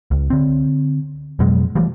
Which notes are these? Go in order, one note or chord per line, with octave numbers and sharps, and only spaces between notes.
C#2
D3 C4
F2 B2 F#3 G#3
E3 F3 G3 A3